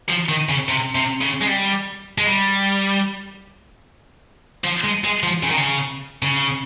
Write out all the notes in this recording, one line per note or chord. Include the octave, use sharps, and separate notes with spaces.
F3
D#3
C#3
C3
C3
C#3
G#3
G3
G#3
G3
F3
G#3
G#3
F3
C#3
D#3
C#3
C#3